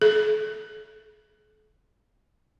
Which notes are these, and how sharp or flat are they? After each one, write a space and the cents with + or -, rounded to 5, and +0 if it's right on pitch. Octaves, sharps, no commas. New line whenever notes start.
A4 -40